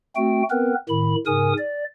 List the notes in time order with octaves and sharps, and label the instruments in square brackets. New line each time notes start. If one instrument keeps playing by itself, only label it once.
[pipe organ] A3 C4 F#4 G5
B3 C4 A#4 B4
A2 D#3 B5
G#2 C#3 A#4 G#5 D#6
D5